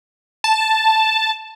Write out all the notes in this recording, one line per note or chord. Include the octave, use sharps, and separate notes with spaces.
A5